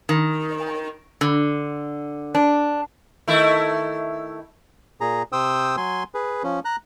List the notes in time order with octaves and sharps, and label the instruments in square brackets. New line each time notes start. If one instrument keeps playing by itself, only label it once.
[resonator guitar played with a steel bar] D#3
D3
D4
[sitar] D#3 A3 E4
[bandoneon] A#2 G#4 A#5
C3 C5 G5 D#6 E6
F#3 G#5 C6
G#4 B4
F3 C#4
A#5 F#6